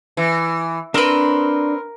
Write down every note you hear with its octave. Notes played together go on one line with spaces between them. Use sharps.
E3
C4 D4 A#4 B4 C6